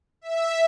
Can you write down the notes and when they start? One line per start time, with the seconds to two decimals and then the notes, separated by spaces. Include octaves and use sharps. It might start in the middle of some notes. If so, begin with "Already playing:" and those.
0.21 E5